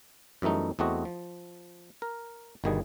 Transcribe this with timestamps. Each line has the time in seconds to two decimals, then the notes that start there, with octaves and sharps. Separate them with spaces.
0.42 F#2 E3 G3 A3 D#4
0.79 E2 A3 C4 F#4 D#5
1.05 F3
2.02 A#4
2.64 G1 B2 D#3 G3 G#4